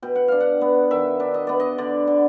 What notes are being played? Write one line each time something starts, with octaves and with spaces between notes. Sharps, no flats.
B2 G5
F#5
D4 F5
F#5
B3
D#3 E5
D4
D#5
B3 D5
D#5
D3 D5
D3